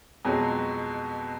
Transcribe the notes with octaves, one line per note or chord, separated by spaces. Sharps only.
F2 B2 F#3 G#3